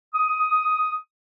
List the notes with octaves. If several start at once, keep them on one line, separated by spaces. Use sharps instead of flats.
D#6